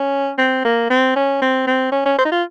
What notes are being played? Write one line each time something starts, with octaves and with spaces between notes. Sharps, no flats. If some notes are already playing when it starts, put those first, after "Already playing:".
Already playing: C#4
C4
A#3
C4
C#4
C4
C4
C#4
C#4
C5
D#4
F4